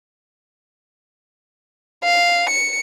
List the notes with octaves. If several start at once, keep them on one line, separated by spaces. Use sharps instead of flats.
F5
C#7